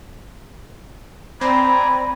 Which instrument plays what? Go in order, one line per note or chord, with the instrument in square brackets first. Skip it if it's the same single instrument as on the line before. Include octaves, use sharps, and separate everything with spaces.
[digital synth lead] C4 [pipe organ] D5 G#5 A#5 [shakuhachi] B5